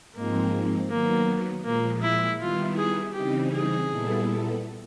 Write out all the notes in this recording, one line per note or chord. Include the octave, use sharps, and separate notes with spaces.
G#2 F3 G#3 A#3 C4 D#4
D#3 F#3 A#3 B3
A#2 F3 G#3 A#3
E4
D#3 G3 B3 E4 F4
G#4
C#3 E3 G3 C4 D#4 G4
G#4
A#2 G3 B3 E4 A4